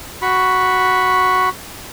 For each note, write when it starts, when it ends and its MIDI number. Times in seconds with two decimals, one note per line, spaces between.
0.22 1.49 66
0.22 1.49 83
0.22 1.49 85